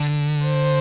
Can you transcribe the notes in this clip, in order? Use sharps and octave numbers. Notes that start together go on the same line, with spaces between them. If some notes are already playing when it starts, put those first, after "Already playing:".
Already playing: D3
C5